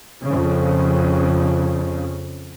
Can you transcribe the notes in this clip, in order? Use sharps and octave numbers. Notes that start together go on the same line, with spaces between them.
F2 C#3